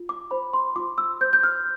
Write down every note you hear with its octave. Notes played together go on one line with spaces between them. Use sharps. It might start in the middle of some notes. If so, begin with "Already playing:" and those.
Already playing: F4
D6
C5 B5
C6
F4 D6
E6
C5 G6
G6
F6